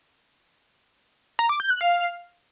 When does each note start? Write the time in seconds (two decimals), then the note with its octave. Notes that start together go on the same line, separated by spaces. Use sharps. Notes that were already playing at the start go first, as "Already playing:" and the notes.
1.39 A#5
1.49 D6
1.60 G6
1.70 F#6
1.81 F5